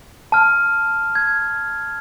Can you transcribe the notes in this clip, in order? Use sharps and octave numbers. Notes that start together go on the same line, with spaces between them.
A5 F6
G#6